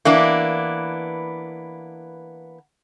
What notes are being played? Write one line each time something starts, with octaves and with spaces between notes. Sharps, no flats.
E3 A#3 B3 D4